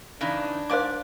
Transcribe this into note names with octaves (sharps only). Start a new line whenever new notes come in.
C#3 E3 D4 D#4
G#2 C5 D5 F5 D6